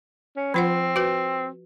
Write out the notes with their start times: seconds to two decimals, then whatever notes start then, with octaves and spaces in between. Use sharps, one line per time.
0.36 C#4
0.54 F3 C4 F4 F#5
0.96 F#4 B4